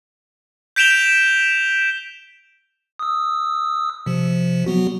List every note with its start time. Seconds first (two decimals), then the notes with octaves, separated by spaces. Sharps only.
0.76 G6 B6 D7 E7 F7 G7
2.99 D#6 E6
4.06 C3 F3
4.66 F#3 B3 F#4